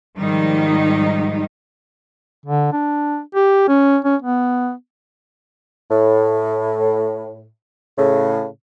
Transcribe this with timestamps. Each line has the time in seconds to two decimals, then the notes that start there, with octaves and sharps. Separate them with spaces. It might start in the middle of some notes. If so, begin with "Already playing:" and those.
0.17 G#2 D#3 F3 G3 D#4
2.46 D3
2.73 D4
3.35 G4
3.68 C#4
4.05 C#4
4.22 B3
5.90 A2
7.97 A2 C#3